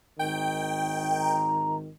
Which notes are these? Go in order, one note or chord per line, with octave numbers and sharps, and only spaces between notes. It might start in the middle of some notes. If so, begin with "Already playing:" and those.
G#1 D#3 G5
A#5